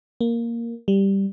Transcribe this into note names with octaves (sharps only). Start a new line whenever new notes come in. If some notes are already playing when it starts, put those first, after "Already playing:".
A#3
G3